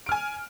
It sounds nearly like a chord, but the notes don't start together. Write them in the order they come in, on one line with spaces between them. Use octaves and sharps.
D7 F6 G#5